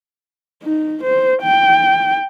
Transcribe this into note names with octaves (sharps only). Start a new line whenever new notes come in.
D#4
C5
G5